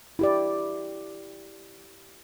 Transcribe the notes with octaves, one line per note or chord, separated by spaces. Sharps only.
E4 G4 D5